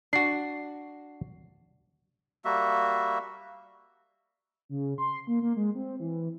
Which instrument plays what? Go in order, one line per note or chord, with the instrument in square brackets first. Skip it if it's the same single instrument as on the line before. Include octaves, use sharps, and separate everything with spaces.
[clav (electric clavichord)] D4 F#4 [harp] C7
[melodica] G3 A#3 F#4 E5
[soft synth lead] C#3
C6
A#3
A#3
G#3
C4
E3